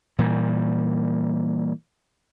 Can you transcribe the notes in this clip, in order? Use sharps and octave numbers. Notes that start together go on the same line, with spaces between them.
A#2 E3 G3